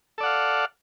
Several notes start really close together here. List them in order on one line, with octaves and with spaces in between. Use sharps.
A4 D5 F#5 F5